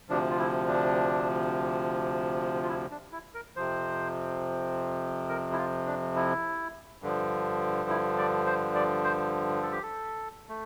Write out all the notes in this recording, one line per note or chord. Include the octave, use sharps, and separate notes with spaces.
D2 C3 F3 D4
F4
E4
D4
F4
E4
D4
E4
A#4
F2 C3 F3 C5
A#4
E4
F4
D4
E4
G2 D3 F3
E4
D5
C5
D5
C5
A4
G4
A4
A3